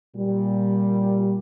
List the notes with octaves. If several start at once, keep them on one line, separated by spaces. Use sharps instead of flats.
A#2 G3